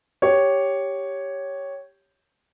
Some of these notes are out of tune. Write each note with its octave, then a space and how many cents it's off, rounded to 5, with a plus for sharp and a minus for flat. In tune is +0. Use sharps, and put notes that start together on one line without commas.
G4 +0 C#5 +0